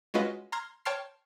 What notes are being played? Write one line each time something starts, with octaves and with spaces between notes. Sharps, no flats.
G#3 C#4 F4 F#4 B4 D#5
A#5 C6 F6 G#6
C#5 G5 A5 C6 F6 C7